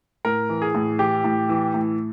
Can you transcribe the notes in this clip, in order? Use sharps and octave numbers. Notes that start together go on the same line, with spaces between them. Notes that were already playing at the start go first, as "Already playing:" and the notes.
A2 A#4
E3
G#4
A2
E3 G4
A2
E3
A2